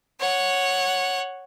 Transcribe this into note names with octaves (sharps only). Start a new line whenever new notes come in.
C#5 F#5